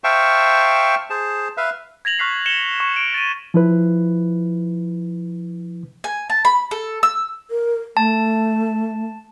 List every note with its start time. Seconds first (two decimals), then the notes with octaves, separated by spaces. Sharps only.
0.04 C5 E5 F5 G5 A5 C#6
1.10 G#4 C5 A5
1.57 B4 E5 F5
2.05 G#6 A#6 F7 F#7
2.19 C#6 F6 F#6 B6 C7
2.46 C#7 E7 G7
2.80 C#6
2.96 D7
3.14 A6 D#7
3.54 F3 E4 B4
6.04 G#5
6.30 A5
6.45 B5
6.71 A4
7.03 E6
7.51 A#4
7.97 A3 A5